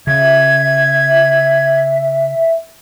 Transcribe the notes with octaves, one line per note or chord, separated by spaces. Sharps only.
C#3 E5 G#6